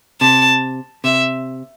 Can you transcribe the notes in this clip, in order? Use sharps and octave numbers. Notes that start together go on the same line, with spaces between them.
C3 A5
C3 E5